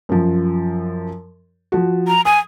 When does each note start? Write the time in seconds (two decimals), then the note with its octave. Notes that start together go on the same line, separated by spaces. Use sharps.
0.09 F#2 F3
1.72 F3 F#4
2.07 A#5
2.25 G#5 D#6